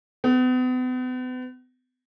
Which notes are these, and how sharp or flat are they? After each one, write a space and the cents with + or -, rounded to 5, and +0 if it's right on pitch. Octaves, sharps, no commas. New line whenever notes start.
B3 +40